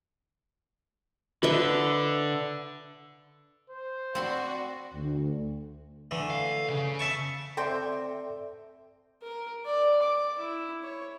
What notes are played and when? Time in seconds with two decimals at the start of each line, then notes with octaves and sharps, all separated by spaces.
1.43 D3 B4 D#5 E5
3.70 C5
4.15 C4 F#4 D5 B5 C6
4.94 D2
6.11 D3 E3 A3
6.30 F5
6.69 C#3
6.99 E5 A5 C#6
7.57 C4 A4 D5 E5 G5 C6
9.22 A#4
9.65 D5
10.02 D6
10.39 E4
10.83 C#5